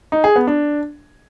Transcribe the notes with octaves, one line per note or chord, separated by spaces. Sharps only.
D#4
G#4
B3
D4